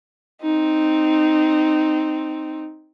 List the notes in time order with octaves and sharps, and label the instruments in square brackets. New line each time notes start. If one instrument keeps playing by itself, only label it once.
[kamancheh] C4 D#4